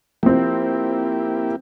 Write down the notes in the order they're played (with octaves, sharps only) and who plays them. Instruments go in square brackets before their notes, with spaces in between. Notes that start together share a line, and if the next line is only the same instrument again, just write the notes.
[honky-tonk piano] F3 C4 [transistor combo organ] A#3 E4 G4